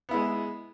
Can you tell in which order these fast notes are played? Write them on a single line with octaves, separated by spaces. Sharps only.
B3 E4 G#3